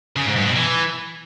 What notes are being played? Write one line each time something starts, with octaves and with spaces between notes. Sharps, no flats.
C#3
G#2
G2
B2
E3